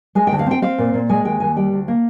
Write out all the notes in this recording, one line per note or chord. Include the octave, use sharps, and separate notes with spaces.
G#3 G#5
G5
D2
F5
C4 G5
C4 F5
A#2
A#2
G#3 G#5
D#2 G5
D#2 G#5
G3 G5
D2
A#3